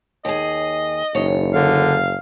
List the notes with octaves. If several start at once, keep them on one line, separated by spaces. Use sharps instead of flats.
D#2 G#4 D#5
F#1 D#2 C#5
D3 F5